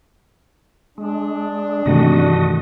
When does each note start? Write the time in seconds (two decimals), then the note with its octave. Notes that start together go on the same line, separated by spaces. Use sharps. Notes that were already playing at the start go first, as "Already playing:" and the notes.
0.98 G#3 D4
1.86 G2 C3 D#3 E3 A3 F#4 D#5